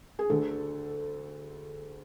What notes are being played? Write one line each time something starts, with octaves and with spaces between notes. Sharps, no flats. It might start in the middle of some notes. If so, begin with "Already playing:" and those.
G#4
D2 D3 A4